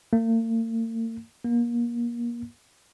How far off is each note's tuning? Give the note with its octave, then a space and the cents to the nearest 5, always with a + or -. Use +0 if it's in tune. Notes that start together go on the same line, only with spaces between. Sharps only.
A#3 -45
A#3 +30